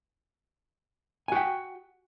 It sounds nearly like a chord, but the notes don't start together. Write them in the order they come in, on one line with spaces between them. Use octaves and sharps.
G#5 F#4 G5